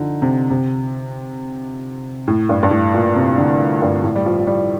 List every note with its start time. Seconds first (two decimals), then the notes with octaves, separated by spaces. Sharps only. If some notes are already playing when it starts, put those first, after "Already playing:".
Already playing: D3 F3 D#4
0.22 C3
0.50 C3
2.28 A2
2.49 G2
2.63 G2
2.71 A2
2.94 A#2
3.16 C3
3.38 D3
3.82 G2
4.03 A2
4.16 G3
4.26 F3
4.39 F3
4.47 G3